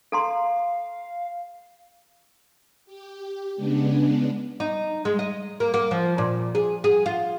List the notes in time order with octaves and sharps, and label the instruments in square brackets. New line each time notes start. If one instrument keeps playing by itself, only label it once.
[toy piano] A4 A#5 C6 [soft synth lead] F5
[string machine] G4
C#3 G#3 B3 D4
[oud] D#4
G#3
D#5
A#3
A#3
F3
A#2
G#4
G#4
F4